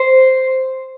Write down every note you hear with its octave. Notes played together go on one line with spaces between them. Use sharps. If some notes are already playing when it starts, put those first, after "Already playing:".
Already playing: C5